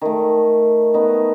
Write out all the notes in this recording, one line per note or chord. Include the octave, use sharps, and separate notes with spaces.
D#3 A3
B3 D#4